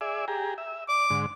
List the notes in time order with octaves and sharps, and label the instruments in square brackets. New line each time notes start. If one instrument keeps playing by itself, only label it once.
[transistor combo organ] G#4 D5 E5
G4 G#4 A#5
E5
[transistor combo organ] D5 [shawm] D6
[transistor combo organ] G#2 D3